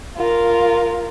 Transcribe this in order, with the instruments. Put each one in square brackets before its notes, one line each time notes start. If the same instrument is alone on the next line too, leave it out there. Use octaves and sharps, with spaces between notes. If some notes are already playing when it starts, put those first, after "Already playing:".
[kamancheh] F4 A#4